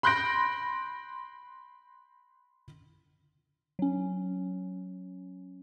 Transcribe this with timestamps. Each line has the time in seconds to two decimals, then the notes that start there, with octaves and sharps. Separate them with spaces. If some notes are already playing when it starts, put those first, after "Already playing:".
0.03 B5 C6 F#6 G6 A#6 D7
3.79 F#3 C#4